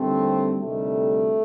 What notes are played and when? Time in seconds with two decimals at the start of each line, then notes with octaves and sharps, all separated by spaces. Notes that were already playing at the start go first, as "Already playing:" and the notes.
Already playing: D#2 D3 G3 A3 C4
0.60 D2 C3 D#3 G3 A3